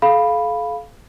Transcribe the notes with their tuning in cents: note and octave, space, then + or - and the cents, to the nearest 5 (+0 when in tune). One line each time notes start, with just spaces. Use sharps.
A4 -40 F5 +0 B5 -5